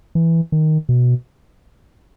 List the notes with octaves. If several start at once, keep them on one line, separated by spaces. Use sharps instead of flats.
E3
D#3
B2